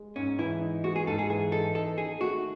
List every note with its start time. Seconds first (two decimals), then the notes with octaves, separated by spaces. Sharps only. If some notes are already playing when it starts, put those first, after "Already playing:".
Already playing: G#3
0.16 G#2 C#4
0.39 E3 E4
0.62 D#4
0.84 G#3 F#4
0.96 G#4
1.07 G#2 A4
1.19 G#4
1.29 E3 G#4
1.52 D#4 A4
1.75 D#4 A4
1.97 D#3 G#4
2.21 A3 F#4